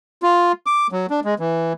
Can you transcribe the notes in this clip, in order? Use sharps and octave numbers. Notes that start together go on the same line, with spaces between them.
F4
D6
F#3
D4
G#3
E3